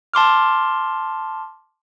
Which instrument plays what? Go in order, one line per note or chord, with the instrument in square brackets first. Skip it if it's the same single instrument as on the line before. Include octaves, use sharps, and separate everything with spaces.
[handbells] A5 C6 D6 F6